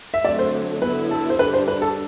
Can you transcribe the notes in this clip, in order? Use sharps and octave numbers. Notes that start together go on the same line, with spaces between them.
E5
D3 F#3 A3 C4 D5
C5
D3 F#3 B3 E4 B4
A4
C5
D3 G3 D4 G4 B4
C5
B4
A4